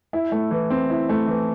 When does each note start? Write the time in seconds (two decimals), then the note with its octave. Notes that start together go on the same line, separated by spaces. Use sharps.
0.13 E4
0.32 A3
0.51 E3
0.70 C4
0.90 E4
1.09 A3
1.28 E3